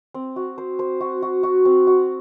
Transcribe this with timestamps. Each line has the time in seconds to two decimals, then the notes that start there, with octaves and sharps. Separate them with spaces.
0.14 C4
0.36 F#4
0.58 C5
0.79 C5
1.01 F#4
1.22 F#4
1.43 F#4
1.65 C4
1.87 F#4